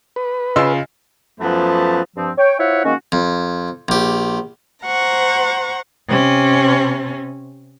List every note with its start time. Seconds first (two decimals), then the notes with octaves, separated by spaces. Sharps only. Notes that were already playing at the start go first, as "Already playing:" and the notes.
0.16 B4
0.56 C#3 F4 D#5 G#5 C6 E6
1.39 F#2 F3 A3 B3 B4 A5
2.16 G2 F3 C4
2.38 C#5 G5
2.59 E4 F4 C5 C#5 E5 F#5
2.84 D#3 G#3 A#3 C#4 F#4
3.12 F2
3.88 A#1 G4
4.85 C5 F#5 A#5 C#6
6.08 C3 C#4